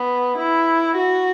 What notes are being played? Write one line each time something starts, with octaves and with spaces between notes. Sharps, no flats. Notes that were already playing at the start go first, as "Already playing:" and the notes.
Already playing: B3
E4
F#4